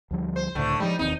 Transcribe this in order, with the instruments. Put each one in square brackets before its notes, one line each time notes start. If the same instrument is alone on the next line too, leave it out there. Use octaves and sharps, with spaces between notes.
[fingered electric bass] D2 F3 G3
[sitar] C5
[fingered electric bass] C#2 A2 [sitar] D3 A3
[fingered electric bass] F3 G#3 [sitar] G3 D#4
[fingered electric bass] E1 D#2 C4 [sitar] D#4